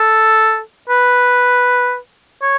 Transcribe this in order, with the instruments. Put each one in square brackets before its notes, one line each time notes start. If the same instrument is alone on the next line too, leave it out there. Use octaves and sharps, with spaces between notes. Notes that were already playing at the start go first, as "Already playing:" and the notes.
Already playing: [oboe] A4
B4
C#5